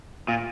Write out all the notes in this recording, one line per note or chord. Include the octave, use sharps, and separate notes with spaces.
A#2